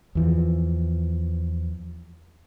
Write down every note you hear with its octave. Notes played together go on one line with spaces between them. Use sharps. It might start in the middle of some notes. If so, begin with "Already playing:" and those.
E2 E3 F3